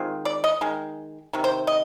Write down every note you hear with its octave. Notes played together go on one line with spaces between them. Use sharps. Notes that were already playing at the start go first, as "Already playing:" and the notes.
Already playing: D#3 G#3 C4 F4
D5
D#5
D#3 G#3
C3 D#3
C5
D#5